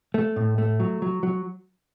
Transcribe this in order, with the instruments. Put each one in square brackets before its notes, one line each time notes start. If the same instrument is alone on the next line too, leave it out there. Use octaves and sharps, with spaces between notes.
[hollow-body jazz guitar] A3
A2
A3
F#3
F#3
F#3